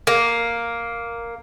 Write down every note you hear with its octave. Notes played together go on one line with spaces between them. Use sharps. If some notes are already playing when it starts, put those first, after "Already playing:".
A#3